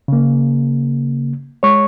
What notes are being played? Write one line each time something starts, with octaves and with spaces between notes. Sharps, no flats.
C#3 A#3
G#3 C#5 C#6